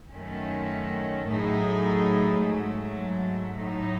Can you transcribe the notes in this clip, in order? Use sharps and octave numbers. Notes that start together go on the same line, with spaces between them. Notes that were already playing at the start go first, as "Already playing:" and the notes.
F#2 D#3 A3 C#4
A2 F#3 A3 D#4 G#4
G#2 F#3 A3
A2 F#3 A3 D#4